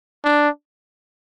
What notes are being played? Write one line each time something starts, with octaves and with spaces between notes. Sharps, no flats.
D4